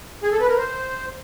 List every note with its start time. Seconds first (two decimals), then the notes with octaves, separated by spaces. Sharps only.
0.23 G#4
0.32 A4
0.40 B4
0.49 A#4
0.57 C5